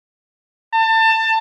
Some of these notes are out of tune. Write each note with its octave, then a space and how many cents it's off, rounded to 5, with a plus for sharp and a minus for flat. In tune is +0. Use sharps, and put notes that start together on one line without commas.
A5 +25